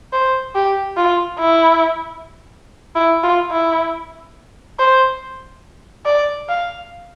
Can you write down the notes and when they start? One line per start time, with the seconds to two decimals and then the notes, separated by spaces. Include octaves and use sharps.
0.13 C5
0.55 G4
0.97 F4
1.40 E4
2.96 E4
3.23 F4
3.51 E4
4.79 C5
6.06 D5
6.49 F5